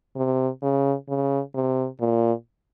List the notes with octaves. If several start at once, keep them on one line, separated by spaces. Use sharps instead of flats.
C3
C#3
C#3
C3
A#2